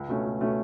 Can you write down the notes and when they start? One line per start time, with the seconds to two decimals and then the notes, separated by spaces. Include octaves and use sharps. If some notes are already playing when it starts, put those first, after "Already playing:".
Already playing: C#2
0.08 B2 A3 C#4
0.25 C#2
0.41 B2 A3 C#4